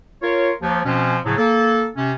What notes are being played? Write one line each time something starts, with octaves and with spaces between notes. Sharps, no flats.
F4 A#4 C#5
D#2 F3
B2 F3 C4 C#4
A2 C#3 F3 F#3
A#3 A4
C3 C#4